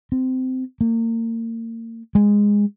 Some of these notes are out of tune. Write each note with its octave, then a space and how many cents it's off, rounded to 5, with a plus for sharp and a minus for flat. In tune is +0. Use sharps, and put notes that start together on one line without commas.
C4 -20
A#3 -35
G#3 -15